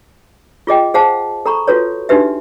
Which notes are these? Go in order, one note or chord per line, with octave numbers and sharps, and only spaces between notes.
F4 G#4 D#5 G5
G#4 C5 F5 F#5 A5
A4 A#5 B5 C#6
F4 F#4 A4 B4 C#5
D4 D#4 F#4 G4 B4 E5